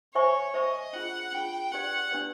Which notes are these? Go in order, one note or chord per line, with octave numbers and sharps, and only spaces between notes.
C5 C#5 E5 G#5 C#6
C5 D#5 E5 G#5 C#6
D4 F4 G#4 F#5
D4 F4 G#4 G5
D4 G4 B4 D5 F#5
D4 G4 B4 D5